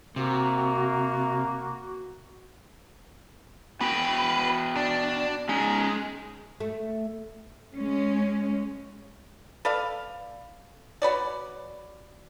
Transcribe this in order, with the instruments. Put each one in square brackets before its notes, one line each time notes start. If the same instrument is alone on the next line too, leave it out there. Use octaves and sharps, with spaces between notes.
[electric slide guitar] C3 [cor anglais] A#3 [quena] F#4
[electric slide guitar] B3 F#4 G5 [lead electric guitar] B4
[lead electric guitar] D4
[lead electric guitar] G#3 [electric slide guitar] C#4 D#4
[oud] A3
[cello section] G#3 C#4
[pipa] A4 B4 D5 F5
F#4 B4 C#5 D5